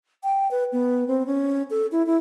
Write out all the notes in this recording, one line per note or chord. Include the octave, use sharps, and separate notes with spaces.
G5
B4
B3
C4
C#4
A4
E4
E4